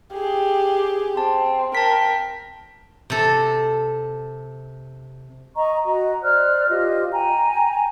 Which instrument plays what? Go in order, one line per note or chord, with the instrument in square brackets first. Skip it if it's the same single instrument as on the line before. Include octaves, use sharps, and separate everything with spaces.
[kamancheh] G4 [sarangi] G#4
[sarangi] C4 [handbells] A5
[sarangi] A#4 [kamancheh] G5 [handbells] A5 B6
[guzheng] C3 A4
[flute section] D#5 A#5 C#6
F#4 D#5 A#5
C5 D5 F6 F#6
F4 G4 C5 D#5
G5 G#5 A#5